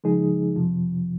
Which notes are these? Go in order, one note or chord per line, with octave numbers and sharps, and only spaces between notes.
C#3 F3 G#3 D#4 G#4
F2 C3 F3